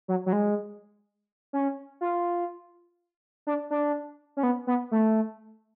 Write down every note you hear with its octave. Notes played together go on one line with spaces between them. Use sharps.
F#3
F#3
G#3
C#4
F4
D4
D4
C#4
B3
B3
A3